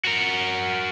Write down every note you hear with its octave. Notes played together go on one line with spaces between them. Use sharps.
F#4 A#4